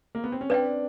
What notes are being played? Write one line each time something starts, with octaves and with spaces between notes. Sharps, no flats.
A#3
B3
C4
C#4
C4 D4 B4 D5 G5